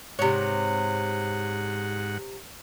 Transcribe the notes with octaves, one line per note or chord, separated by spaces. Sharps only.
G#2 C3 C#5 F#5